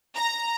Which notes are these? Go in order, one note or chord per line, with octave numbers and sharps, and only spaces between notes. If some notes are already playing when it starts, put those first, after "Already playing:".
A#5